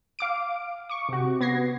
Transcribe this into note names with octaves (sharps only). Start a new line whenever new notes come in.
F5 D6 D7
C#6 D6
C3 F#4
B3 G#6 A#6 C7